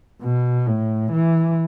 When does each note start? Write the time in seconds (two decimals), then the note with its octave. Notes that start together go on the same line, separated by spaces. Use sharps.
0.22 B2
0.67 A2
1.12 E3